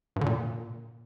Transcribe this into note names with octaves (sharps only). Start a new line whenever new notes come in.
G2
D3
A#2